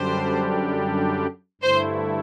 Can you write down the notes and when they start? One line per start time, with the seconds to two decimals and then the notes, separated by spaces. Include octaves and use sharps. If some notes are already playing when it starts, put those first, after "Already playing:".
Already playing: F#2 D3 G3 D4 G4 C5
1.62 G2 D3 A3 E4 C5